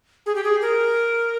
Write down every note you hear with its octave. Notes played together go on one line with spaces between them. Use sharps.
G#4
G4
G#4
A#4